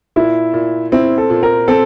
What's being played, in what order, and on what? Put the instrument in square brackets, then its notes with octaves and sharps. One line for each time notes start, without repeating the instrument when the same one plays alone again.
[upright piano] A#2 [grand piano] E4
[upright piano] A#2
[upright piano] C4 [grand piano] E4
[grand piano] A4
[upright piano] A#2
[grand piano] A#4
[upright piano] C4 [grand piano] A4